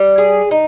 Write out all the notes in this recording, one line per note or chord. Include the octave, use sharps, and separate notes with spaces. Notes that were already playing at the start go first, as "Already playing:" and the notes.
Already playing: G3
G#4
D#4